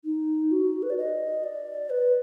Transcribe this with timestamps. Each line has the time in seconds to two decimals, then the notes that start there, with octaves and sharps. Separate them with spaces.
0.05 D#4
0.51 F#4
0.83 B4
0.90 D5
0.98 D#5
1.44 D5
1.90 B4